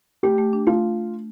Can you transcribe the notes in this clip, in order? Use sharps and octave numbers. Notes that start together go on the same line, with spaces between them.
A3 G4
A3
D4
A3 F4